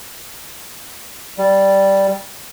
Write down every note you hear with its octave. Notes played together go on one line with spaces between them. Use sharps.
G3